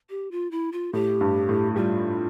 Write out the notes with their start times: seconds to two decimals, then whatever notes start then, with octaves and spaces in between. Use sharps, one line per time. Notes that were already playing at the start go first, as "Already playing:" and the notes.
0.10 G4
0.31 F4
0.51 E4
0.72 F4
0.93 A2 G4
1.21 G2
1.49 A2
1.76 G3 F4